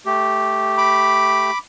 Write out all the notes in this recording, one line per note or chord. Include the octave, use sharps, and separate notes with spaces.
A3 G4
B5 D6